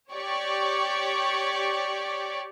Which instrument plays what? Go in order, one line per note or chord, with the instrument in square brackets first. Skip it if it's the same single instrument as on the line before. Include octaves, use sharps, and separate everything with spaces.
[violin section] G4 C#5 D5 C#6 D6